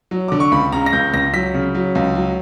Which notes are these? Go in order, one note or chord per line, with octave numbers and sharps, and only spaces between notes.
F#3
D3 D6
C#6
C#2 B5
C#3 A#5
A#6
C#2 G6
C#2 A#6
F#3 B6
C#3
F#3
C#2
F#3